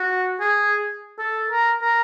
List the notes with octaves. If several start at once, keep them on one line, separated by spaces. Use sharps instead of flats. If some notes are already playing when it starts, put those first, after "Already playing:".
Already playing: F#4
G#4
A4
A#4
A#4